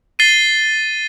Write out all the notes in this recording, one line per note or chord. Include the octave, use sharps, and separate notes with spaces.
A6 C7 D#7 G7